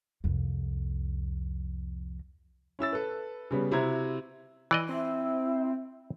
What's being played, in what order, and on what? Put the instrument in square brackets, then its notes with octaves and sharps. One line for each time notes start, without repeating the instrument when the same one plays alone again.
[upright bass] C2 F2
[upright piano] C#4 E4 E6 A6
A4 B4
C#3 G3 B3
C3 E4 F#4 C5 A#5 G#6
[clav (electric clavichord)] E3 D5 D#5
[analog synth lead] C4 [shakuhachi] E4